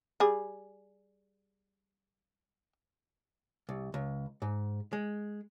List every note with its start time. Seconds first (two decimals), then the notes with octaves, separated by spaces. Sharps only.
0.20 G3 G#4
3.69 C2
3.94 C#2
4.42 G#2
4.93 G#3